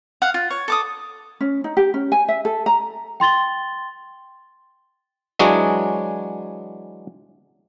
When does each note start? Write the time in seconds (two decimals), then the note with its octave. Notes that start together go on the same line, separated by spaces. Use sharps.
0.22 F5 F#5
0.34 F4
0.50 C#5
0.68 A4 D6 D#6
1.41 C#4
1.64 D#4
1.77 G4
1.94 C#4
2.12 G#5
2.28 E5
2.45 A4
2.66 A#5
3.20 G5 C6 A6 G7
5.39 E3 F#3 G#3 D4 G#4 C#5